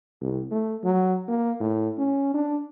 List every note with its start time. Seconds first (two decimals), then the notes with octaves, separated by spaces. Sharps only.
0.21 C2
0.51 A3
0.84 F#3
1.28 A#3
1.60 A2
1.98 C#4
2.34 D4